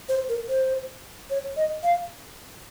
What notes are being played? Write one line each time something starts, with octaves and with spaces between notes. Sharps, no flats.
C5
A#4
C5
C#5
D#5
F5